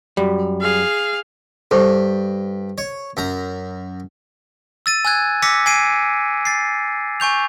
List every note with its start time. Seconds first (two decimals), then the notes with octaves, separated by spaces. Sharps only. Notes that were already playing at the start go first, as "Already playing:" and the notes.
0.17 F#2 G3
0.61 G#4 F5
1.71 G2 A4 C5 C#6
2.78 C#5
3.17 F#2 A#5
4.86 E6 A6 D#7
5.05 G#5 E6 F#6 G#6
5.42 D6 E6 A#6 B6 C#7
5.66 G#5 G#6 C7 D7 D#7
6.45 A6 C7
7.20 G#5 C#6 G6 F7